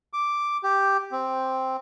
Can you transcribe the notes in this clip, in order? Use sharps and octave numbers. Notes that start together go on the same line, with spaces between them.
D6
G4
C4